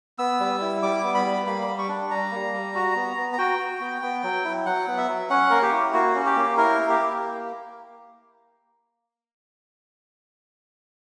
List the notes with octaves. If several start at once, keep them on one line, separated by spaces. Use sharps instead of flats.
B3 E6
G3
E4
G3 D6
B3
B5
G3
A#3 B5
G3
C#6
D4
G3 A#5
A#3
G3
F#4
B3
B3
A#5
F#4 G5
F#4
B3
B3
F#3
E4
F#3 F#5
B3
E5
F#3
C#4 F#5
A#3 A#4
G4
E4
A#3 F#4
C#4
G4
A#3
E4 A#4
A#3
G4
A#3